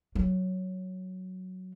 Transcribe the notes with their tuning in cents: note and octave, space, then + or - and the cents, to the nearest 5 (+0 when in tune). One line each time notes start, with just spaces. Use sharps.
F#3 +5